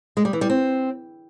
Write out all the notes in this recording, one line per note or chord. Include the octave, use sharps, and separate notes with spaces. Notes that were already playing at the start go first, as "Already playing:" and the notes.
G#3
G3
E3
G3
C4